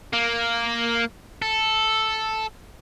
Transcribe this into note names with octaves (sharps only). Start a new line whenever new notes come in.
A#3
A4